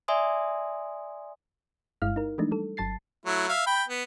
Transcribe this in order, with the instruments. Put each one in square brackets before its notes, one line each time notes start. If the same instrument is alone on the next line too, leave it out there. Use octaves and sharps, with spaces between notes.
[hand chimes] D5 E5 G#5 C6 D#6
[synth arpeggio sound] G1 G2 G#3 E4 F5 F6
D#4 A#4
E3 F3 G#3 A3 D4 D#4
G3 A4
G1 F#3 A5 A6 C7
[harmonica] F#3 A3 E4
E5 F5
G5 B5
B3